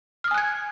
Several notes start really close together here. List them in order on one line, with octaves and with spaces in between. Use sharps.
F6 D#6 G#5 F#6 G#6